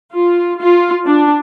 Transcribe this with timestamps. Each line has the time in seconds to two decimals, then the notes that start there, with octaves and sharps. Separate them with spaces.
0.14 F4
0.61 F4
1.07 D4